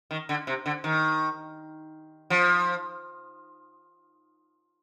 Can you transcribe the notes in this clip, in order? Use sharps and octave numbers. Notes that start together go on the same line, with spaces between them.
D#3
D3
C3
D3
D#3
F3